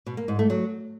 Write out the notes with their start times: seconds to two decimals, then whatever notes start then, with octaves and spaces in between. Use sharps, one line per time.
0.06 B2
0.17 A#3
0.28 G#2
0.39 A3
0.50 F#3